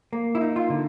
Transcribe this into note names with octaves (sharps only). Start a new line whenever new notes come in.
A#3
E4
D#4
F4
D3